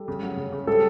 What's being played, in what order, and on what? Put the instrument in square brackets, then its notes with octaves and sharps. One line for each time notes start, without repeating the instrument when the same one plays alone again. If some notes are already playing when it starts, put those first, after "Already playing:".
Already playing: [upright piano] G3 [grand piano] A4
[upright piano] C#3
F#3
C#3
C#3
[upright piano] G3 [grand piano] A4